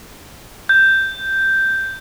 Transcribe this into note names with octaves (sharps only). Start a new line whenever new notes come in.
G6